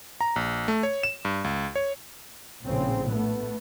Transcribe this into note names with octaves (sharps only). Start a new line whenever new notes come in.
A#5
A#1
A3
C#5
E7
G2
C#2
C#5
A#1 A2 C#3 C4
A3 B3